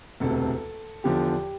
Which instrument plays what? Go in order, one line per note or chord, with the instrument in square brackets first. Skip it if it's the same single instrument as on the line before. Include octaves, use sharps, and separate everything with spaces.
[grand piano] E1 D2 C3 A4
E2 D3 F3 G4